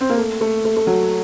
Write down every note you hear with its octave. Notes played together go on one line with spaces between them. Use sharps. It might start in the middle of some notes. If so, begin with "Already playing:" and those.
C4
A#3
A3
A3
A3
A3
F#3